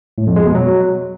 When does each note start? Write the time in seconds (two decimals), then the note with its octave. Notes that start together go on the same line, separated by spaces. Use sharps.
0.18 A2
0.27 F2
0.36 G#3
0.45 B2
0.55 F#3